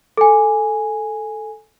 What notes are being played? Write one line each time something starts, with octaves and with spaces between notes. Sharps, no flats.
A4 G#5